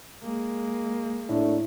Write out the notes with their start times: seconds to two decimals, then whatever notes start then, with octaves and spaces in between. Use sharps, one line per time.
0.23 G#3 A#3
1.29 A2 A3 D4